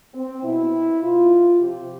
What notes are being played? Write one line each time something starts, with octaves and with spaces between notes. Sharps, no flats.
C4
B2 E4
B2 F4
C3 F3 G4